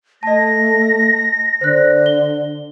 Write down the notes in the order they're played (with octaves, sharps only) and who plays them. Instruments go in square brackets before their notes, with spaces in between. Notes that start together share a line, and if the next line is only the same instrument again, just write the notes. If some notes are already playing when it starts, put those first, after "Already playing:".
[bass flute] A3 [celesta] D#5 A5 [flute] A#6
[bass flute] D3 [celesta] C5 F#6
[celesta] G7